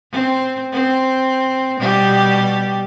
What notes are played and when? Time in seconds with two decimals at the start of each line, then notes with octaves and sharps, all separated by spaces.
0.12 C4
0.73 C4
1.80 B2 G3 G4